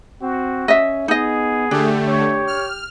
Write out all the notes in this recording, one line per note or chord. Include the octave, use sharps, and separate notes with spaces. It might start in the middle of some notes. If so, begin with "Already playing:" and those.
C4 F#4
C#4 D#5 E5
B3 D#4 G#4 D#5
D3 A3 D4 G4
C#5
F6